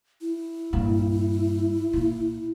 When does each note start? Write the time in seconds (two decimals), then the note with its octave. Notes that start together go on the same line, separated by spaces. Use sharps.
0.21 E4
0.73 G2 A#2
1.93 A#2